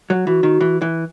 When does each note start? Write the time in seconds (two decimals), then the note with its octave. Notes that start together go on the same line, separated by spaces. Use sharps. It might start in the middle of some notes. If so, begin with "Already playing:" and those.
0.10 F#3
0.26 E3 F#4
0.43 D#3
0.61 E3
0.82 E3